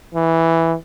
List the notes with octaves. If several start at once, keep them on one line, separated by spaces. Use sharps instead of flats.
E3